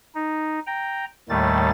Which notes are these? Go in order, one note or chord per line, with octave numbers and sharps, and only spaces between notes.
D#4
G5 A#5
D#2 A2 D#3 G3 A3 A6